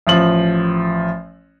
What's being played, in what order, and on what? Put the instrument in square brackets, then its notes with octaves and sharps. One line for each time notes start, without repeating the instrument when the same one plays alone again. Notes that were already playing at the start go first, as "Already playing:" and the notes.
[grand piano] A1 F3 F#7